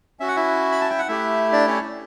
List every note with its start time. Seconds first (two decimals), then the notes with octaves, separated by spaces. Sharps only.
0.20 C#4 F#4 E5
0.28 F#5
0.36 E4 E5
0.72 B5
0.81 A5
0.90 G5
0.99 F#5
1.08 A3 E4 G4 E5
1.52 D4 D5
1.67 C#4 C#5